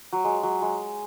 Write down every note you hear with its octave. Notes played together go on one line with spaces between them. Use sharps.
F#3
G#3
F#3
G#3